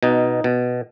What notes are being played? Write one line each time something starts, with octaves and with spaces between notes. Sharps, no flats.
B2 D#4
B2